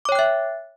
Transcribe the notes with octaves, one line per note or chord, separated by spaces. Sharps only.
C#5 E5 G5 D6 F#6